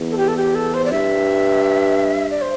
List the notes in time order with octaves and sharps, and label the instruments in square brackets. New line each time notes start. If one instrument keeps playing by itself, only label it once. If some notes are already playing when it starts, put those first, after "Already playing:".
Already playing: [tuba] E2
[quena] A4
G4
A4
G4
A4
C5
D5
[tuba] G2 [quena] E5
[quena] D5
C5